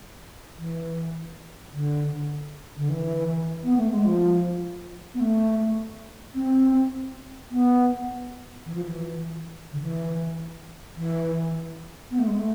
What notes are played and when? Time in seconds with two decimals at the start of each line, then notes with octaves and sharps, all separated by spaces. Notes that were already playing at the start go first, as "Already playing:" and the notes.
0.58 E3
1.73 D3
2.77 D3
2.89 E3
3.63 B3
3.76 A3
3.90 G#3
4.04 F3
5.14 B3
5.20 A3
6.34 C4
7.50 B3
8.65 E3
8.75 F3
8.85 E3
9.72 D3
9.80 E3
10.96 E3
12.11 B3
12.18 A3
12.26 G#3
12.34 A3